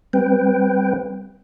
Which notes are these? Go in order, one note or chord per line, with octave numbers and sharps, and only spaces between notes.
G3 C4 B4 G5